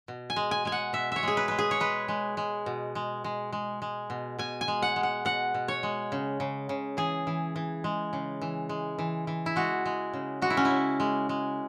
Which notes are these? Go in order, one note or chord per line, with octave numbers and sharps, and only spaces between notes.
B2
G#5
G#3
G#5
G#3 G#5
F#5
B2 E5
C#5 E5
G#3 G#4
B4
G#3 B4
G#4
C#5
G#3 B4
G#3
G#3
B2
G#3
G#3
G#3
G#3
B2
B2 G#5
G#5
G#3
F#5
G#3
F#5
B2 F#5
B2
C#5
G#3
C#3
C#3
C#3
E3 G#4
E3
E3
G#3
C#3
E3
G#3
E3
E3
E4
G#3 F#4
G#3
C#3
G#3 F#4
E4
C#4
E4
C#3
G#3
G#3